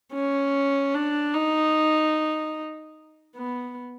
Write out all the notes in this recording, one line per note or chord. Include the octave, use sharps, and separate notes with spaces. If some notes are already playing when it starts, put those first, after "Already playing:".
C#4
D4
D#4
B3